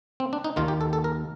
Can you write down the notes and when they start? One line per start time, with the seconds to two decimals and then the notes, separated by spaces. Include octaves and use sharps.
0.20 C4
0.33 D4
0.44 D#4
0.56 D#2 D#3 A#3 F4
0.68 G4
0.81 A4
0.93 A4
1.04 A#4